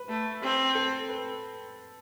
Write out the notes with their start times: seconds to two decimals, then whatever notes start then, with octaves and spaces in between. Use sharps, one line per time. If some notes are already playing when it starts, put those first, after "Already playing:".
Already playing: B4
0.08 A3
0.42 C4
0.75 A4
1.09 B4